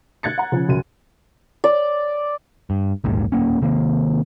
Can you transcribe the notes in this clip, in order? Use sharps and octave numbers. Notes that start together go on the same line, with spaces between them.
F#6 G#6 A6 C#7
F#5 A#5
C#3 F3 C#4
C#2 F#2 D#7
D5
G2
A#1 D#2 G#2 D#3
D1 F2 A#3 C#4
C3 D#3 A#3